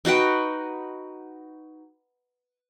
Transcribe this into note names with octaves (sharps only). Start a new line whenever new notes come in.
D#4 F#4 B4 G5